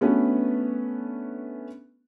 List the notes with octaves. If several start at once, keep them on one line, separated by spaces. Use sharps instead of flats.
A3 B3 C#4 D4 F#4 B4